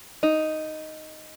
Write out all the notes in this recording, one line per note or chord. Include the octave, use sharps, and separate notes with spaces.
D#4